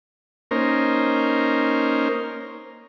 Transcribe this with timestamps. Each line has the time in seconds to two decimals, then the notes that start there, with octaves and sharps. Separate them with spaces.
0.51 A#3 C#4 D#4 A#4 C5